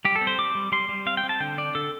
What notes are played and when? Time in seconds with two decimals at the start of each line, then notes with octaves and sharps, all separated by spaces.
0.05 G3 G4
0.16 A4
0.21 C4
0.27 C5
0.38 G3 D6
0.55 G3
0.72 G3 C6
0.89 G3
1.06 C4 F5
1.17 G5
1.24 C4
1.29 A5
1.40 D3 G5
1.58 D4 D5
1.75 D3 A4